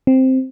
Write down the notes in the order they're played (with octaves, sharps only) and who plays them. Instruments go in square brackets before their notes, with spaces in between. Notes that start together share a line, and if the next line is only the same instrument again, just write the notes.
[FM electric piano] C4